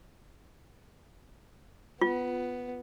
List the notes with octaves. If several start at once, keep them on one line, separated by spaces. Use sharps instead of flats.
B3 F4